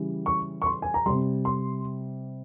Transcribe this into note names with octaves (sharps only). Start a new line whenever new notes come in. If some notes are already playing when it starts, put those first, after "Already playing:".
Already playing: C#3 E3 G3
C#6
C#6
C6
G#5
A#5
C3 G3 C6
C6